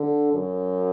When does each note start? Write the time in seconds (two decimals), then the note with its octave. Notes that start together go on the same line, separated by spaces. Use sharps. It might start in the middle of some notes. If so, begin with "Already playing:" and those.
Already playing: D3
0.33 F#2